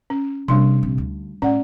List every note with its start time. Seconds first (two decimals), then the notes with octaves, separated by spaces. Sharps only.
0.10 C#4
0.48 C3 G3 A#3 D4 C6
0.83 A#1 C3
0.98 D2
1.42 A2 C#4 D5 F#5